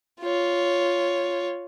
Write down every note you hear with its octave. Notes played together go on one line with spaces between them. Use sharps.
F4 C#5